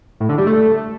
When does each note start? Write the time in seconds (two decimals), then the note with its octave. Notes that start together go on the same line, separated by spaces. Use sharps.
0.20 A2
0.29 D3
0.38 G3
0.47 A3